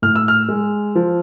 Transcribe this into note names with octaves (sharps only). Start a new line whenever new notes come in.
A2 F6
E6
F6
G#3
F3